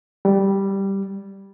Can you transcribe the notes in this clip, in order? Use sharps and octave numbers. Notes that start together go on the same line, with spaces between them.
G3